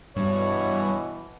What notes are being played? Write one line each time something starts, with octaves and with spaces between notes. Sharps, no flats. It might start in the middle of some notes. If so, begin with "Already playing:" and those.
G2 B2 E3 C#5